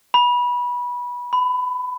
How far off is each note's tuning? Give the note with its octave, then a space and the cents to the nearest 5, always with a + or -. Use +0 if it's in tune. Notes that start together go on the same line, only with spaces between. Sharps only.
B5 -20
B5 +20